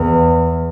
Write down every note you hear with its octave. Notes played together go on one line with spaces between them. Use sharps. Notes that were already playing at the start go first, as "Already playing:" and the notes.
Already playing: E2